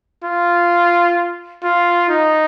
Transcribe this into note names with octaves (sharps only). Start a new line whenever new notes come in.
F4
F4
D#4